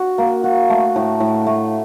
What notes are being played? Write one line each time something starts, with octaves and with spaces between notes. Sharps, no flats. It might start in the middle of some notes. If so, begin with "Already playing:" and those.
Already playing: F#4
A#3
F#4
A3
A2
A2
A3